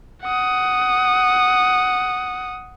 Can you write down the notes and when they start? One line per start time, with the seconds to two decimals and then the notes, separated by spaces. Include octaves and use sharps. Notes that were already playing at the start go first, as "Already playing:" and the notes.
0.23 F#5 D#6